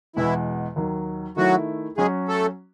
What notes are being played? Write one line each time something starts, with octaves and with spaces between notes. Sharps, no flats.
E2 B2 E3 G#3 E4
D#2 D#3 F#3
D#3 F#3 A3 E4 F#4
F#3 G#3 C#4 F#4 G#4
A3 A4